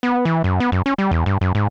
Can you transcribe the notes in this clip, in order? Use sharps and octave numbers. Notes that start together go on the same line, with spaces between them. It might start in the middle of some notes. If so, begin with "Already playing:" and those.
B3
E3
F#2
B3
F#2
C#4
G3
E2
G2
F#2
G#2